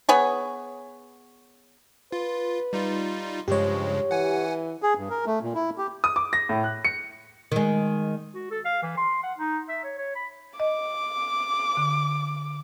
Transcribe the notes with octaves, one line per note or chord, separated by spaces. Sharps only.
B3 G#4 C#5
F4 B4
G3 D#4 F4
G2 C#3 F3 G#3 G4 C#5
E3 F#5 G#5
G#4
G2
A#4
A3
A#2
E4
G4
D#6
D6
A#6
A2
F#6
C#7
D#3 G#3
F#4
A4
F5
E3
C6
F#5
D#4
E5
C#5
C#5
B5
D#5 D6
D3